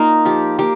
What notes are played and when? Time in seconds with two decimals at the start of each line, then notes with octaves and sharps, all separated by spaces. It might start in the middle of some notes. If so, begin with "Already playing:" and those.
Already playing: A#3 D#4 F4
0.25 F3 G4
0.59 A#3 G4